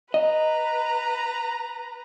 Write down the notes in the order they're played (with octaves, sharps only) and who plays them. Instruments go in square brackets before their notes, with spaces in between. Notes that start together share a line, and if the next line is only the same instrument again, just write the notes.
[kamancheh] B4 A#5 [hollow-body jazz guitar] D#5